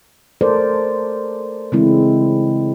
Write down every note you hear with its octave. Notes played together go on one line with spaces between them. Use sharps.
A3 A4 A#4 C5 D5
C#3 E3 G#3 C4 E4